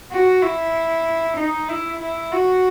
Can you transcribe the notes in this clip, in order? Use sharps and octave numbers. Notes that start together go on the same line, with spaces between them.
F#4
E4
D#4
E4
E4
F#4